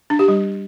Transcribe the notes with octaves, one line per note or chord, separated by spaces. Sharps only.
D4
G4
G3